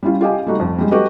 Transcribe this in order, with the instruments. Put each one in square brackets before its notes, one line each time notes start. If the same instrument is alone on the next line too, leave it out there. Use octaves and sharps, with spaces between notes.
[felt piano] G3 C#4 E4 F4
F4 G4 D#5 G#5
G3 A3 D#4 F#4
F2
G3 G#3
A3 F#4 G4 B4 D#5